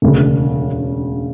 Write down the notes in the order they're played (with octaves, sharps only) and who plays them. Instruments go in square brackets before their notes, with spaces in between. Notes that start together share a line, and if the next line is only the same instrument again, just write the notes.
[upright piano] E1 D2 C#3